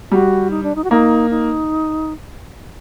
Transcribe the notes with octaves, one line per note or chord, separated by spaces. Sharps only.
G3 F#4
D#4
D4
D#4
F#4
A#3 D#4
D#4